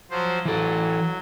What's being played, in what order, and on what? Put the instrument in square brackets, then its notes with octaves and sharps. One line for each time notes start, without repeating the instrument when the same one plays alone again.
[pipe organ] F3 F#3 C5
[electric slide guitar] E3 A4 [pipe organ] F#3